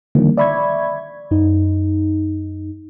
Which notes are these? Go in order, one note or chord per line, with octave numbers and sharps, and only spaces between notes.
D3 D#3 F3 G3 A#3
D5 E5 B5 C#6 G#6
F#2 D#4